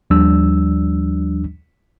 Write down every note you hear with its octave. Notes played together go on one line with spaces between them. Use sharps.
D#2 F3 G3 D4 E6